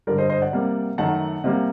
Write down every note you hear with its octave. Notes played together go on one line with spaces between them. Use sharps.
G2 D3 G3 A#4 D5
C5 D#5
C5 D#5
D5 F#5
C3 G3 A#3
F#2 D#3 A3 F#5 A5
C3 G3 A#3